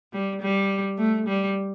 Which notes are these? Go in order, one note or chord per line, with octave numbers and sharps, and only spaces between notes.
G3
G3
A3
G3